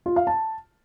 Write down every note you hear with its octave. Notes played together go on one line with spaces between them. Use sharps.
F4
F5
A5